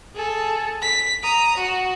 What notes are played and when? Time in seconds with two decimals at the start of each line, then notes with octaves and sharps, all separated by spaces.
0.15 G#4 A4
0.82 B6
1.23 A#5 D#6
1.57 F#4